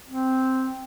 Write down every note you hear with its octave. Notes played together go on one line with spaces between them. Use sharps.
C4